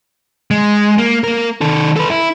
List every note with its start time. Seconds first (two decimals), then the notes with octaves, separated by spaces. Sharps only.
0.51 G#3
0.98 A#3
1.24 A#3 A#4
1.61 D#3 A4
1.96 A4 B4
2.10 E4